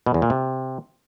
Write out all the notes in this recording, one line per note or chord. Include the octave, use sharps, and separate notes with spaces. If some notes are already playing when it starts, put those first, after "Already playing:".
B2
E2
A#2
C3